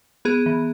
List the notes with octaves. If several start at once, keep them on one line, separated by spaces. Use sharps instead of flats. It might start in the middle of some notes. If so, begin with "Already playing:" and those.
B3 G#4
E3